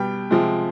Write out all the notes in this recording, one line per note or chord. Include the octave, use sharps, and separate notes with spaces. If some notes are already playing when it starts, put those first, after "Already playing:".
Already playing: B2 G3 G5
C3 F3 G#3